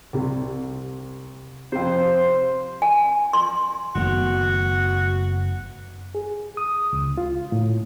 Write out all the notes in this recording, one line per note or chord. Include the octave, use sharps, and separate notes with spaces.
C2 C3
F2 C3 C5
G#5
C6
F#1 D#3 F#3 A3 B3 F#4
G#4
D#6
C#2
F4
A2